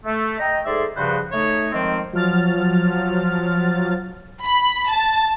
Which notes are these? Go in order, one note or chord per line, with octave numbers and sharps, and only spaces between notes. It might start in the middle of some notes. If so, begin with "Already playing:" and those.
A3
D#5 G5 A#5
G#2 G#4 A4 D5 E5 C6
G2 C#3 F3 F#4 B4 C5
A3 D#4 C#5
D#3 F3 G#3 A#3 C4
F3 F#3 F6 A6
B5
A5